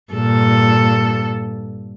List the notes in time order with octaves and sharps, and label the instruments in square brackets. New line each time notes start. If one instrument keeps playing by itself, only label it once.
[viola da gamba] G2 A#2 A4